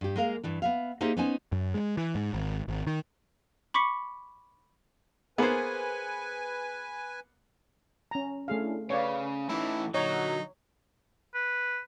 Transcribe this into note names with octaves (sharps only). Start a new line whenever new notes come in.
G2 G4
G#3 A#3 A#4 F5
G2 E3 D4
B3 E5 F5
A#3 D#4 G4 G#4 C5 E5
B3 C#4 D#4 C5 G#5
F#2
G#3
E3
G#2
G#1
G#1
D#3
B5 C#6 D6 B6 C#7
A#3 B3 G#4 B4 C5 G#5
C#4 A#5
A3 C#4 D4 E4 G#4 F5
C#3 B4 C#5 D5 F5
A2 E3 C#4 D#4 E4
A#2 D3 F#3 D#4 C#5
B4